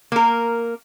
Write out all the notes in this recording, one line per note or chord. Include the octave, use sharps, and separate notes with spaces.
A#3 A#4